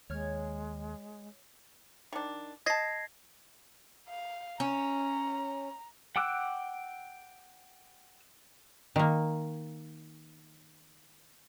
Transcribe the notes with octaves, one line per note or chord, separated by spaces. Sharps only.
D#2 G#3 C#5 F6 G#6
D#3 D4
D#5 A5 G#6 A#6 C7
F5
C#4 A#5
F#5 G5 D6 E6 F#6
D#3 A#3